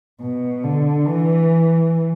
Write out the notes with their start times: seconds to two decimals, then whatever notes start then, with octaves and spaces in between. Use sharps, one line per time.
0.21 B2
0.64 D3
1.07 E3